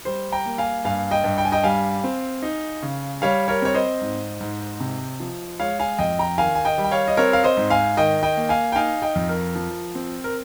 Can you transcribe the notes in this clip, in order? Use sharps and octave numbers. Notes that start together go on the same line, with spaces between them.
G3 C5
G5 A#5
A#3
F5 G#5
G2 F5 G#5
D#5 G5
G2
G5
G#5
D#5 G5
G3 F5 G#5
C4
D#4
C#3
G3 C#5 F5
A#4 C#5
C4 C#5
C5 D#5
G#2
G#2
C3
F3
G#3 C#5 F5
F5 G#5
F2 D#5 G5
G5 A#5
D#3 F5 G#5
G#5
D#5 G5
G3
G5
C#5 F5
D#5
C4 A#4 C#5
F5
C5 D#5
G#2
F5 G#5
D#3 D#5 G5
D#5 G5
A#3
F5 G#5
G5
D#4 F5 G#5
D#5 G5
F2
A#4
F3
C4
A#4